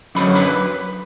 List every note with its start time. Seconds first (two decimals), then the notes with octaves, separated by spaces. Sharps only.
0.15 F#2 D3 F#3 C#4 B4 B5
0.35 B4 B5